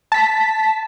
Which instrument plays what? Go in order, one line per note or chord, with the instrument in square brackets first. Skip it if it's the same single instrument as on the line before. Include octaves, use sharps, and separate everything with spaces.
[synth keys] A5 B6